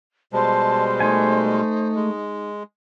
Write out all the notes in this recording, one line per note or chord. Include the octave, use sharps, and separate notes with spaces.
B2 G3 G#3 C5 A5
A3 D#4 G#5
G#3